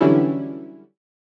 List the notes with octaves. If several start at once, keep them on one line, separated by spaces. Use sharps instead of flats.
D3 E3 F#3 G3 C#4 E4